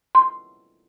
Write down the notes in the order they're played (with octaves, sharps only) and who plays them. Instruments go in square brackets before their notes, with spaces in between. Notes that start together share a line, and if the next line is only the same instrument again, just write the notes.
[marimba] C6